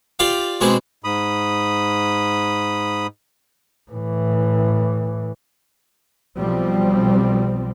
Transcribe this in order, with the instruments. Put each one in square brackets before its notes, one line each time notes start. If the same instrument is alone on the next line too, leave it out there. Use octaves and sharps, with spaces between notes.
[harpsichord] F4 G4 D5 F5
B2 G#3 C4 D4 G#4
[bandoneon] G#2 B5 D#6
[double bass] A2 E3
[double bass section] B1 B2 F3 G3 C4